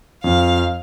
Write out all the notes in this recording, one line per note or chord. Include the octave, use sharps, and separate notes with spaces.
F2 F5